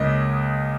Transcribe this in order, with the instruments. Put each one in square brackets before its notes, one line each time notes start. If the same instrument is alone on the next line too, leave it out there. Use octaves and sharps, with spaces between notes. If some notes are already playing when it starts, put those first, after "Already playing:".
Already playing: [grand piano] C#2 C#3 A#3 C#4 D#5